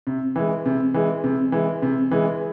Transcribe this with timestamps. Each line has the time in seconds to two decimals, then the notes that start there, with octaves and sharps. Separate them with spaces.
0.07 C3
0.36 E3 G#3
0.66 C3
0.94 E3 G#3
1.24 C3
1.52 E3 G#3
1.82 C3
2.11 E3 G#3